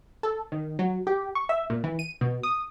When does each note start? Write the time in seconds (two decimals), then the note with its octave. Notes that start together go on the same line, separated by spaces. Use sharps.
0.23 A4
0.52 D#3
0.79 F#3
1.07 G4
1.35 C#6
1.49 E5
1.70 A#2
1.84 E3
1.99 D#7
2.21 B2
2.43 D#6